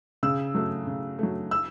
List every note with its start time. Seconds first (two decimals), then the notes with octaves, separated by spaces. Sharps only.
0.23 C#3 E6
0.55 F#3 A3
0.87 C#3
1.19 F#3 A3
1.51 E6